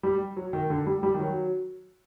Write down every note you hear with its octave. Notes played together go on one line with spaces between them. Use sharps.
G3
F#3
D#3
D3
G3
G3
D#3
F#3